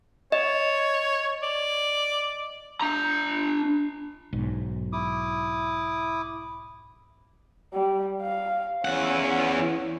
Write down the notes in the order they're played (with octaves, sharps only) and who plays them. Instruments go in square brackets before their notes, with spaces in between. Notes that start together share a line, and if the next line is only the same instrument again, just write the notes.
[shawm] C#5 [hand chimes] D#5
[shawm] D5
[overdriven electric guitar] D4 A#5
[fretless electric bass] B1 G#2
[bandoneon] E4 D6 D#6
[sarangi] G3
F5
[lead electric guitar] E2 F#5 [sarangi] C#4